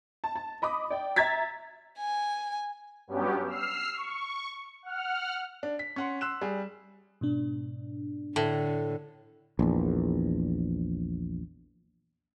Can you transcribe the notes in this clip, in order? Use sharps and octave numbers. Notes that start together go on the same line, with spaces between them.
A5
A5
D#5 B5 D6 D#6
D5 G5
E5 A#5 G#6 A6 B6
G#5
G2 F#3 B3 C#4 G4
E6 F6 C7
C#6
F#5 F6
D4
B6
C#4 F#5 C6
C6 E6 F#6 E7
G3 G#4
G#2 B2 D4
A2 D3
A#1 E2